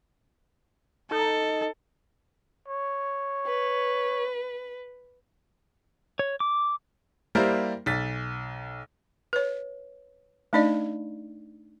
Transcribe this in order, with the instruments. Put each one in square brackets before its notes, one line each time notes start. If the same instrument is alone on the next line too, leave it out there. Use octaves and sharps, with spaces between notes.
[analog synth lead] D#4 [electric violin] A4
[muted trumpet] C#5
[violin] B4
[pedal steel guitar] C#5
D6
[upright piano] G3 A#3 E4 A#4 C5 D5
B1 A6 B6
[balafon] B4 C#5
A3 D4 D#4 D5 D#5